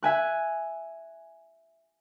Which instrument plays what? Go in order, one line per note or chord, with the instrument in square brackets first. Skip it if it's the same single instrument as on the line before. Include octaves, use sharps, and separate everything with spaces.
[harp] E5 G#5 F#6